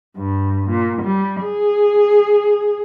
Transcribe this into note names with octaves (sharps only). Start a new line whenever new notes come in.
G2
A#2
G3
G#4